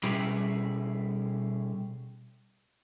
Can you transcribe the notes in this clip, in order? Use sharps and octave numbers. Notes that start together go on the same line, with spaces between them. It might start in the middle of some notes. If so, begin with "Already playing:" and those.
B2 G3 C#4 E4 G#4